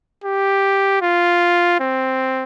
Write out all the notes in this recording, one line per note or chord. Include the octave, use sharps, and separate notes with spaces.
G4
F4
C4